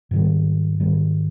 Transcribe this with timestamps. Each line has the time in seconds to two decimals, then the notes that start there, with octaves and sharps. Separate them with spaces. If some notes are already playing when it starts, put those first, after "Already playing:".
0.11 G#2 D#3 G3
0.80 G#2 D#3 G3